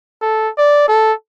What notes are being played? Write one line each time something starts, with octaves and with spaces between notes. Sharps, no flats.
A4
D5
A4